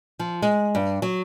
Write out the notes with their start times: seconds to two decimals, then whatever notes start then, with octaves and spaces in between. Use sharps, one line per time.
0.19 F3
0.42 G#3
0.75 G2
1.02 F#3